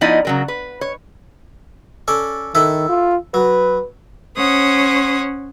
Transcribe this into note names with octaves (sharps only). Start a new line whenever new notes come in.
F3 B3 D#4 E4 D5 D#5
C#3 F#3 A#4
B4
C#5
C#4 A4 D5
D#3 E4 A4 B4
F4
F#3 B4
C#4 C5 C#5 F#5 D#6